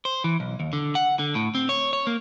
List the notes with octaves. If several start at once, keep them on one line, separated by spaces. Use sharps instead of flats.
C5
E3
B1
D#2
D3
F#5
D3
A2
C4
C#5
C#5
A#3